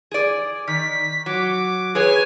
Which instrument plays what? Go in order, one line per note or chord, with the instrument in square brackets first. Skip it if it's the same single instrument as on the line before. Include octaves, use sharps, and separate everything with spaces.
[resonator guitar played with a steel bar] G#4 D5
[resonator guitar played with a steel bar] D#3 [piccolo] B6
[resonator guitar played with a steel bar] F#3 [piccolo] D6
[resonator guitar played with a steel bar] G#4 B4 C#5 [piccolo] G#5